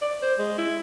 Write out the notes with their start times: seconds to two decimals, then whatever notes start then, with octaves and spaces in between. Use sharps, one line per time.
0.02 D5
0.23 C5
0.39 G#3
0.58 E4